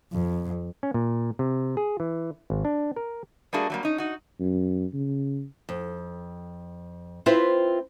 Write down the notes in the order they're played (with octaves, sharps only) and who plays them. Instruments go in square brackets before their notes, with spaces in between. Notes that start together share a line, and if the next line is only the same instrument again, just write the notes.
[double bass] F2
[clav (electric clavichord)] C#4
A#2
C3
G#4
E3
G#1
D4
A#4
[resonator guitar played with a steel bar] G3 A3 A#3 D4 F#4 G#4
F#3 G3 A#3
C#4 D#4
D#4 F#4
[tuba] F#2
C#3
[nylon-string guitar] F2
C4 E4 F4 B4 C5 E5